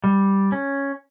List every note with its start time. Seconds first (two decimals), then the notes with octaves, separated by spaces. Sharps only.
0.04 G3
0.52 C#4